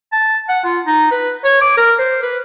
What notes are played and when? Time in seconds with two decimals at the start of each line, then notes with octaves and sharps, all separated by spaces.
0.13 A5
0.49 F#5
0.64 F4
0.87 D#4
1.11 B4
1.44 C#5
1.62 D6
1.78 A#4
1.99 C5
2.23 B4